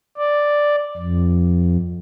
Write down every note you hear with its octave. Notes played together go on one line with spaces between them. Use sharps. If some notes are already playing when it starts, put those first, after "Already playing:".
D5
F2